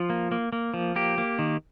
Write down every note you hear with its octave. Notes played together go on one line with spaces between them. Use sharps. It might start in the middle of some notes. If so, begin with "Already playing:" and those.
Already playing: F3 F4
A#3
A#3
A#3
F3
A#3 G4
A#3
D#3